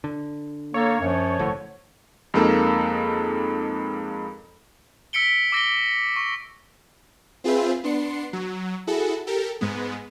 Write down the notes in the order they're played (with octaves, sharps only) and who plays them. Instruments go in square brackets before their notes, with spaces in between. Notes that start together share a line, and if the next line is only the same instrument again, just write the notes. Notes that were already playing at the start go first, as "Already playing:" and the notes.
[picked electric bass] D3
[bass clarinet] A#3 [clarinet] A4 [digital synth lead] C#5
[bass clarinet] F#2 [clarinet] F3
[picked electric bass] F#1 A2 [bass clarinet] D3
[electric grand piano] F2 G#3 A#3 D#4 A4
[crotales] E6 B6 C#7 D7 G7
D6 E6 A#6 C7 D7 G7
C#6
[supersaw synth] C4 F4 G#4 B4 C5 E5
B3 D4 C6 C7 C#7
F#3
E4 F#4 G#4 A4
G4 A4 A#4
G#2 G#3 B3